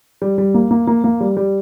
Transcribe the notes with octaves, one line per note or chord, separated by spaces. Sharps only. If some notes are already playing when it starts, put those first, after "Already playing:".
G3
G3
A#3
A#3
A#3
A#3
G3
G3